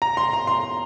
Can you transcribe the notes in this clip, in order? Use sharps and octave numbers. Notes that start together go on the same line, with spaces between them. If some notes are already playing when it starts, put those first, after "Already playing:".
A#5
C6
A#5
C6